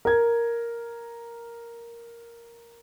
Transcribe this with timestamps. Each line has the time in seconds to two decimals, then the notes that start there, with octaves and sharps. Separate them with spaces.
0.05 A#4 G#6